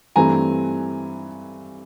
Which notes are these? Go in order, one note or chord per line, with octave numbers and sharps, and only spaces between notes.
G2 E3 A3 C4 G#5 A#5